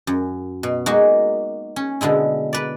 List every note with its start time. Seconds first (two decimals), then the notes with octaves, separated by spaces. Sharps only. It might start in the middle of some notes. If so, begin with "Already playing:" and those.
0.07 F#2
0.63 B2
0.86 G#3 A#3 D#4 F#4
1.76 C#4
2.01 B2 D3 G#3 E4
2.53 B4 D5